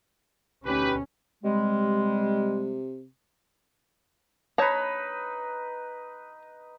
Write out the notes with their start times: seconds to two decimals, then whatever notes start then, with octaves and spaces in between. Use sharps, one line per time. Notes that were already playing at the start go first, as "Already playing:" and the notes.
0.66 D2 B2 C#4 D#4 G4 B4
1.44 C3 G3 G#3
4.58 D#4 B4 C#5 A5 A#5